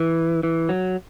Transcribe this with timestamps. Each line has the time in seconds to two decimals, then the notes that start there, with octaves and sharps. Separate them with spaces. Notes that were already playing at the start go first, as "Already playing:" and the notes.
Already playing: E3
0.43 E3
0.69 F#3